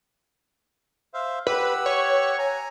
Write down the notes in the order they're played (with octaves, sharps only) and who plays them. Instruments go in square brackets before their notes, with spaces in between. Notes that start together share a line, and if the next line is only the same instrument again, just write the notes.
[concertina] C5 E5 F5
[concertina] G4 F#5 E6 [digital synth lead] B4
[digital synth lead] C#5
[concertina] G#5 A#5